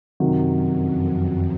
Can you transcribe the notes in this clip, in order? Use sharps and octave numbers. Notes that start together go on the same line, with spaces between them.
F#2 C3 D#3 F#3
F2